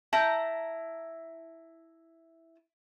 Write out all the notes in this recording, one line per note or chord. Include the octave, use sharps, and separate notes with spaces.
E4 A5 A#5 G6